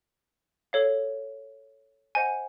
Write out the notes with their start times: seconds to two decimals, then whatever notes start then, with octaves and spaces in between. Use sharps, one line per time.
0.73 A4 C#5 F5
2.15 C5 D#5 F#5 G#5